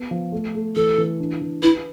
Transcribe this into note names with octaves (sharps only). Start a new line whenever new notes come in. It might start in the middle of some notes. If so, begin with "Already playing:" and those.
Already playing: B3
F3
A3
A3
E3 A4
E3
D4
E3
E4 B4